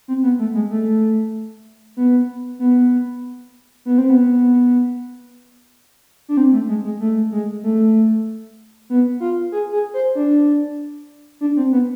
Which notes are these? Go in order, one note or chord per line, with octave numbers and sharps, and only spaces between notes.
C4
B3
A3
G#3
A3
B3
B3
B3
C4
B3
D4
C4
A3
G#3
G#3
A3
G#3
A3
B3
F4
G#4
G#4
C5
D4
D4
C4
B3